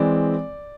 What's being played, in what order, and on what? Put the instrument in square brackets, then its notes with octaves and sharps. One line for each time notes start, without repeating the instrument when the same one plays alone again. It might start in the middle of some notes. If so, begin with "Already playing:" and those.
Already playing: [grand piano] E3 G#3 C4 D5